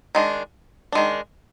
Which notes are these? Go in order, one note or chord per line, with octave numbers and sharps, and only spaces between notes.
D#3 G#3 D4
D#3 G#3 D4